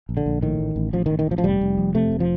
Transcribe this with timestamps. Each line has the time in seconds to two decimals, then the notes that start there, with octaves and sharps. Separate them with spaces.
0.09 A#1
0.17 D3
0.26 A#1
0.42 A2 D#3
0.59 A1
0.76 A1
0.93 A1 F3
1.06 D#3
1.10 A1
1.19 D#3
1.27 A1 F3
1.38 F3
1.44 F1 G3
1.61 F1
1.78 F2
1.95 C3 A3
2.12 F1
2.20 F3